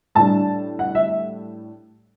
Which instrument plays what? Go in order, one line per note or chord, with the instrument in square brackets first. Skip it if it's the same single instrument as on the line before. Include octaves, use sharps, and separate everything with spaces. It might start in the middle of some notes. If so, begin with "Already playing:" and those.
[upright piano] A2 G3 D4 A5
F#5
E5